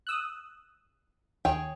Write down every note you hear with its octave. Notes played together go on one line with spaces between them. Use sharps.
D#6 E6 F#6
D#2 D#3 G#4 C#5 G5